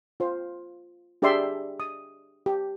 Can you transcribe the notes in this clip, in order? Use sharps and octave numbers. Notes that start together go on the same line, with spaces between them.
F4 C5
D4 G4 G#4 D5 E5 C6
D#6
G4